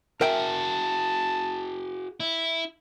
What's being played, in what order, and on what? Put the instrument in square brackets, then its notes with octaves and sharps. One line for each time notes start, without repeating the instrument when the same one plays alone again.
[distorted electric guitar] F#4 G#4 [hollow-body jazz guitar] A#4 E5 G5 [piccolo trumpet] A5
[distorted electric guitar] E4